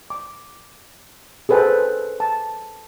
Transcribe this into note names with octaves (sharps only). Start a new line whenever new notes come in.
D6
G#4 A4 B4 C5 G5
A5